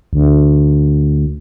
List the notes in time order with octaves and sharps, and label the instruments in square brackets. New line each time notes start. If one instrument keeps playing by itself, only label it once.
[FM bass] D2